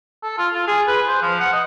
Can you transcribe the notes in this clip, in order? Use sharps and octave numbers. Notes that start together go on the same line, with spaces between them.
A4
F4
F4
G#4
B4
C5
F3
F#5
D#5